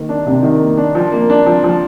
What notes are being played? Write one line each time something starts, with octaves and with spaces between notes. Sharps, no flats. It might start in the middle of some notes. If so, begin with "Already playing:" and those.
Already playing: D#3 A#3
D4
C3
D#3
A#3
D4
F3
A#3
D4
F3
F3